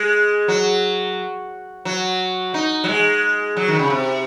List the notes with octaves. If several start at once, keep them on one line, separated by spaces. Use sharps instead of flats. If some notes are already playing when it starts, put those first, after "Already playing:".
Already playing: G#3
F#3
F#3
D#4
F#3
G#3
F#3
D#3
C#3
C3